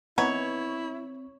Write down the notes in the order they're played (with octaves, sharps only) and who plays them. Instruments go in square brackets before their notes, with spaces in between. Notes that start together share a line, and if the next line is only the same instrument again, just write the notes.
[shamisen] E3 B3 D#4 [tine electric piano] C4 [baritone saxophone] E4 [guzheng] C#5